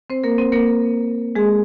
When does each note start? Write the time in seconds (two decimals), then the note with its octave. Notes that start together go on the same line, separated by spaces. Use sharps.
0.10 C4 C5
0.24 A#3 A#4
0.38 C4 C5
0.52 A#3 A#4
1.35 G#3 G#4